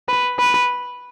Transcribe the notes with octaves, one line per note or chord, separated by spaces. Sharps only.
B4
B4